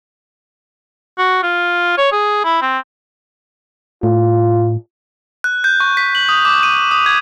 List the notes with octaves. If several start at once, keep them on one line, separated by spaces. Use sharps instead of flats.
F#4
F4
C#5
G#4
E4
C4
A2 F4
F#6
G6
C#6
B6
F#7
D#6
D6
D#7
D#6
G#6